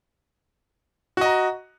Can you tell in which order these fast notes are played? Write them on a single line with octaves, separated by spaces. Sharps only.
F#4 D#5 A#5